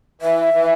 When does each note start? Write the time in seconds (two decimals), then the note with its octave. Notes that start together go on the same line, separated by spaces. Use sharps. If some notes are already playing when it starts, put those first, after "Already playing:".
0.21 E3 E5
0.54 E3